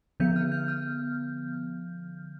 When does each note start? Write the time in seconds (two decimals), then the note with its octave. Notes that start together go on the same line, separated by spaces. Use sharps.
0.20 D3 F3 B3 G6
0.36 F6
0.52 G6
0.68 F6